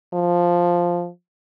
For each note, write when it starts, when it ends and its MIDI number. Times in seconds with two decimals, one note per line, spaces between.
0.14 1.09 53